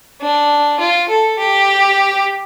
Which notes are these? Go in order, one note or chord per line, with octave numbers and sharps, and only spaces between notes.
D4
F4
A4
G4